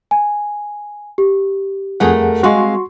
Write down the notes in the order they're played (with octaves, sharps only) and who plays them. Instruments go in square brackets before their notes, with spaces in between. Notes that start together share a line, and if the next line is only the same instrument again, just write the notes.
[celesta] G#5
G4
[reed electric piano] F2 G#4 F#5 [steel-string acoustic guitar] F3 A3 A#4
[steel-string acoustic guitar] G#3 C4 F5 [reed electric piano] F#4 C6 C#6